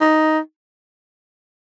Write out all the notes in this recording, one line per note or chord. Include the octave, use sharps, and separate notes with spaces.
D#4